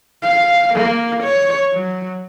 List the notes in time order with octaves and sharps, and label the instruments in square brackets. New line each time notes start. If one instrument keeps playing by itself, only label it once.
[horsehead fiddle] F5
A#3
C#5
F#3